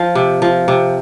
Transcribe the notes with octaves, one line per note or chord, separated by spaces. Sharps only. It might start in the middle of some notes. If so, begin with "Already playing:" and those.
Already playing: F3
C3
F3
C3